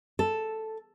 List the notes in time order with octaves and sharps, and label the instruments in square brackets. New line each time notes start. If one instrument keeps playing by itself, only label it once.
[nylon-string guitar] A4